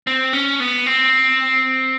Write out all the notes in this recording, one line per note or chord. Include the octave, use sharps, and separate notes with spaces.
C4
C#4
B3
C4